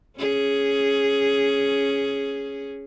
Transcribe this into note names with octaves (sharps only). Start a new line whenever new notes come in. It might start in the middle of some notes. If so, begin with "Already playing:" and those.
C#4 G#4